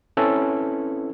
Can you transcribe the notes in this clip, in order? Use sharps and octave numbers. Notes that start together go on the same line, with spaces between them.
C4 C#4 E4 A4 B4